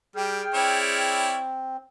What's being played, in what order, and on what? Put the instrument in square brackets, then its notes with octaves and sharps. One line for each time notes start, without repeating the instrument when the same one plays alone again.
[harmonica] G3 [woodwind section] G#4 G5 F6
[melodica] C4 [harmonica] E4 C#5 D5